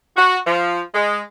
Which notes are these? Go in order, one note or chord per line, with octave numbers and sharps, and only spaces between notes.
F#4
F3
G#3